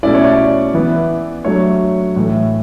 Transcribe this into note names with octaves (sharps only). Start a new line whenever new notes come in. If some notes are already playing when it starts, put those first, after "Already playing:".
B2 A3 C#4 E4 D5
C#5
D5
E3 B3 E4
F#3 A3 D4 C#5
A2 E3 A3